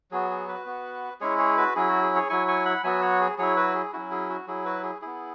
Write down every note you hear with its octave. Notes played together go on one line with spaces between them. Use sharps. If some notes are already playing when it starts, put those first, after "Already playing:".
F#3 B3 F#4 G#4
G#4
F#4 B4
B3 F#4
G#3 C#4 E4 G#4 C#5
G#4 C#5
F#4 B4
F#3 C#4 E4 G#4
F#4
G#4
G#4 C#5
F#3 E4 G#5 C#6
G#5 C#6
F#5 B5
F#3 B3 F#4 E5 G#5
C#5 F#5
G#4
F#3 E4 G#4 C#5
F#4 B4
G#4
F#3 C#4 E4 F#4
G#4
F#4
F#3 E4 G#4
F#4 B4
G#4
B3 E4 G#4